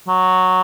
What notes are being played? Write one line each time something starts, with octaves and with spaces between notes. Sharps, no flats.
F#3